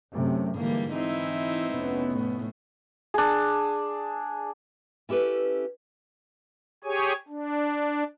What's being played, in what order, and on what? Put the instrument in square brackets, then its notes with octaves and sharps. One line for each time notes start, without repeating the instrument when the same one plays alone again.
[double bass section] F#2 C3 A3
[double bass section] G#2 D3 E3 [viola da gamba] G3 A#3
[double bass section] E3 [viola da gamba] C4 D#4 E4
[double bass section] F1 B3 C#4
[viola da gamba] A2
[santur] D4 G#4
[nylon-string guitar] C#4 E4 G4 A4 B4
[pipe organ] G4 G#4 C#5 G#5
D4